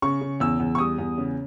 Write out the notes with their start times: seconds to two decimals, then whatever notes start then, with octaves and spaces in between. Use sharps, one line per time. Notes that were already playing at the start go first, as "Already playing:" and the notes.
0.02 C#3 C#6
0.21 C#3
0.40 E2 E6
0.60 E2
0.75 C#6
0.79 G3 D#6
0.99 E2
1.18 C#3